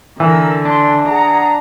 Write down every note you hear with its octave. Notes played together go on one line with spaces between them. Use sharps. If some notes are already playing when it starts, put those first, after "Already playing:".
D3 E3 A#4 E6
D4 C6
G#4 F#5 A#5